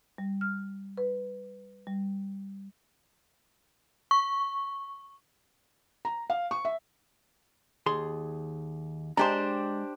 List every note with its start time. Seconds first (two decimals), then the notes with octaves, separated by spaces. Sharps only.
0.18 G3
0.41 F6
0.97 B4
1.87 G3
4.11 C#6
6.05 A#5
6.30 F5
6.51 C#6
6.65 E5
7.86 D#2 G#4 C6
9.17 G#3 D4 G4 C5 A#5